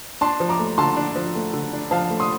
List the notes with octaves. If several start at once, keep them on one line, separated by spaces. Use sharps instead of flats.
D4 A5 C6
F3
A#5 D6
A3
D3 A5 C6
D4
F3
A3
D3
D4
F3 F5 A5
A3
C6 D#6